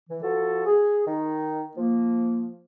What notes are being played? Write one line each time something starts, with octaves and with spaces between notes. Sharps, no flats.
E3
F3 F#4 A4
G#4
D#3 D#4
F3 A#3